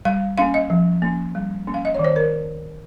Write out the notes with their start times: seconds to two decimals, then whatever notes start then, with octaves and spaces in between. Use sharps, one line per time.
0.05 G3 F5
0.38 A#3 C#4 F5
0.54 D#5
0.70 F3
1.02 A#3 C#4
1.35 G3
1.67 A#3 C#4
1.74 F5
1.85 D#5
1.95 D#3 C#5
2.05 C5
2.16 A#4